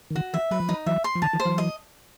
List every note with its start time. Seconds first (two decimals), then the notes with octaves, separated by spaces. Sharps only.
0.10 D#3
0.15 D3 E3 F#4
0.33 D#3 F3 E5
0.51 F#3 B4
0.60 F3
0.69 E3 F#3 D#4
0.86 E3 F#3 E5
1.04 C6
1.15 F3
1.22 D3 E3 A5
1.33 D#3 F3
1.40 C5
1.45 E3 F#3
1.58 D#5